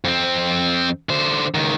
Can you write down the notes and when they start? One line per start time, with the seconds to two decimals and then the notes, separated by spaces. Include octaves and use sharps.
0.05 F2 C4
1.09 D3 C5
1.55 C#2 D#3